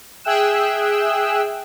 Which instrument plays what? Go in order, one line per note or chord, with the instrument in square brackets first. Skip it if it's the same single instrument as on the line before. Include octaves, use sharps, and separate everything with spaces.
[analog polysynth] G#4 E5 G5 E6 F#6 E7